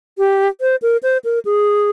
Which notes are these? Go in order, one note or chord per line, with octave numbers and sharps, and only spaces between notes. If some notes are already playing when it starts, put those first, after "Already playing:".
G4
C5
A#4
C5
A#4
G#4